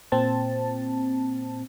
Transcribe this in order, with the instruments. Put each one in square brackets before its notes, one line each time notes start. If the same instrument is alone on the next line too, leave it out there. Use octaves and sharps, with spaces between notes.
[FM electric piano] A#2 C4 A5